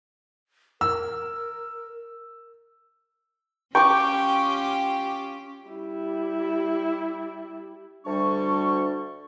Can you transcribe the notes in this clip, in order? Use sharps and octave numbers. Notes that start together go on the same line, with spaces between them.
A#4 E6
C#4 F4 G4 G5 C#6 D6
G3 E4
D2 G3 D4 C#6